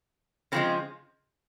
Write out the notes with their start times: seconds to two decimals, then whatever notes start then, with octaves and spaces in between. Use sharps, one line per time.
0.52 C#3 F3 G#3 C4